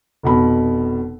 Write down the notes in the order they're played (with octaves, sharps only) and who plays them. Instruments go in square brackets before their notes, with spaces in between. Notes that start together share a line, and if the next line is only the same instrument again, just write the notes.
[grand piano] F1 B2 B5